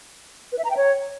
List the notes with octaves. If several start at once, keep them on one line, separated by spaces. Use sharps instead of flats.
B4
E5
A#5
G5
C#5